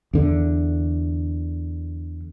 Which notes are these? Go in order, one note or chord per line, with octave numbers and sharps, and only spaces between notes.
E2 D3